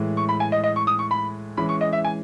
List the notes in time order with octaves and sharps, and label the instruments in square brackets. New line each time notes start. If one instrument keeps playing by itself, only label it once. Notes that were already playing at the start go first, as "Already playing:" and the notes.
Already playing: [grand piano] A2 E3 G#3
[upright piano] C#6
B5
G#5
D#5
D#5
C#6
D#6
C#6
B5
[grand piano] E3 G#3 C#4 [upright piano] B5
[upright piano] C#6
D#5
E5
G#5